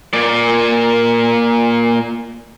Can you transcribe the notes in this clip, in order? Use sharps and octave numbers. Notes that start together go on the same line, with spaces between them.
A#2 D5